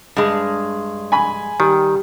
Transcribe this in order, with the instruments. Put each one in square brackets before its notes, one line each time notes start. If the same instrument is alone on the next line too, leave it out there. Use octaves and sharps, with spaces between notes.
[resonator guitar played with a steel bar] G2 G#3
[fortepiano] G#5 B5
[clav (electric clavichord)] D#3 [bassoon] G3